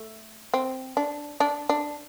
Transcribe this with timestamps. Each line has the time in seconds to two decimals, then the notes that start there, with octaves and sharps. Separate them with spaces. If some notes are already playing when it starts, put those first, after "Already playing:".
Already playing: A3
0.54 C4
0.97 D4
1.40 D4
1.69 D4